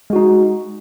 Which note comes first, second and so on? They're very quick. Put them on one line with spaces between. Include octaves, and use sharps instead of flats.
G#3 F#4 D#4